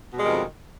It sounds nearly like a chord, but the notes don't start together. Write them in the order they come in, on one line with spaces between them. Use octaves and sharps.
B2 G3 G#3 D#3 F2